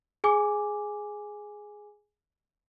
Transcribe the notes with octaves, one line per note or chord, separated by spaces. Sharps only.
G#4 G#5 D6